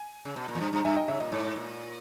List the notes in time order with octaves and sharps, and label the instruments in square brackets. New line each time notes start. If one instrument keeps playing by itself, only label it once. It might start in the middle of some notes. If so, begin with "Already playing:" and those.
Already playing: [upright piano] G#5
[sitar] C#3
B2
A#2
E2
G2
G2
[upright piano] A#5
[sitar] G2 [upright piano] E5 G#5
[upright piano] D#5 G5
[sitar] C#3 [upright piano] C#5 E5
[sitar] A#2 [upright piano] D#5
[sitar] G#2 [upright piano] C#5
[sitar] A#2